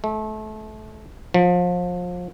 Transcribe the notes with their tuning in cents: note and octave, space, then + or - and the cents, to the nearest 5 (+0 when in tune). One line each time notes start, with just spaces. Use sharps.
A3 -30
F3 +30